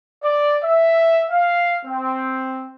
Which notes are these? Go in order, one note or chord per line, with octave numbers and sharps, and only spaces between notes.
D5
E5
F5
C4